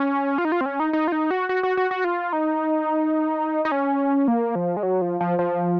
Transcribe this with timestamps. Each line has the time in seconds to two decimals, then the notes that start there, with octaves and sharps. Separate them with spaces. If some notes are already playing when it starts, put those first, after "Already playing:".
Already playing: C#4
0.38 F4
0.45 D#4
0.52 F4
0.61 C4
0.66 C#4
0.80 D#4
0.93 D#4
1.08 F4
1.12 D#4
1.31 F#4
1.49 F#4
1.63 F#4
1.77 F#4
1.91 F#4
2.04 F4
2.33 D#4
3.65 D#4
3.72 C#4
4.28 A#3
4.55 F3
4.77 G#3
4.83 F#3
5.02 F3
5.20 F3
5.39 F3